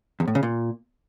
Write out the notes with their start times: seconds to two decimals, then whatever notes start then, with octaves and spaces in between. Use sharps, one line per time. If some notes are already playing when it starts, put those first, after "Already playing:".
0.20 E2
0.28 A2
0.35 C#3
0.43 A#2